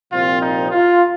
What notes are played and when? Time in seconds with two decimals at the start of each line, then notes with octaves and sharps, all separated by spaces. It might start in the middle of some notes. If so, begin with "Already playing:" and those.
0.11 C2 A#2 F3 C4 F4
0.41 D#4
0.71 F4